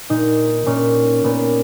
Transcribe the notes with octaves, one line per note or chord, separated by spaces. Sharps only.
A#2 D#4
A#2 C#4
A#2 B3